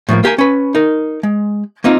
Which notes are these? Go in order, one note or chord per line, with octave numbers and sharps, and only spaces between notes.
A2 F3 F#3 A#3
A#3 G4 A#4 G#5
C#4 B4
D#4 A#4
G#3
A#3 C4 D#4 F4